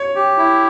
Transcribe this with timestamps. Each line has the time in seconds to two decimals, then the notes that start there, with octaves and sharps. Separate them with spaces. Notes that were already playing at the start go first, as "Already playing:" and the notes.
Already playing: C#5
0.15 G4
0.38 E4